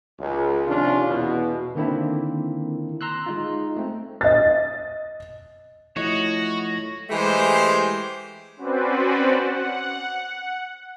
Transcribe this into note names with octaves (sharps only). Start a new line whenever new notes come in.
C#2
C3 D#3 F3 C#4 D4 F4
E2 B2
D3 D#3 A#3 C4 D4 E4
A#5 C6 E6 F#6
G#3 D#4 F4
A3 C4
D#5 A6
F3 A3 E4 F#4 C#5 D#5 A#6
E3 G#3 A3 G4 C5
C4 C#4 F#4 B4 C5 D5
F#5